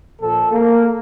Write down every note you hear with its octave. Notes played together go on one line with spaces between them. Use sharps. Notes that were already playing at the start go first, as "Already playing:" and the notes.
A#2 F3 A4
A#3